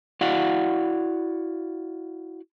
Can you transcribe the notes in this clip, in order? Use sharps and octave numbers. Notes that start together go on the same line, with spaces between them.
E4 F#4 D5 F5 F#5